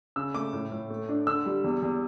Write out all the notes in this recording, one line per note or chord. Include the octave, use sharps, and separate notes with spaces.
C#3 E6
A3 D6
A2
A2
A3
D4
D3 E6
G3
E2
E2